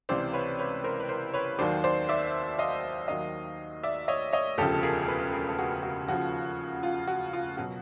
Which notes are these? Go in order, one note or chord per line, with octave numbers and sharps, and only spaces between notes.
C#2 C3 E3 C5 D5
B4 C#5
B4 C#5
A#4 C5
B4
A#4 C5
B4 C#5
D#2 D#3 F#3 C5 D5
C5 D5
D5 E5
D#5 F5
D#2 D#3 F#3 D#5 F5
D5 E5
C#5 D#5
C#5 D#5
E1 D2 C#3 F3 G4 A4
G#4 A#4
A4 B4
G#4 A#4
A4
F#4 G#4
F#4
D#2 C#3 F3 F#4
F4
F#4
F4
B2 F#3 F#4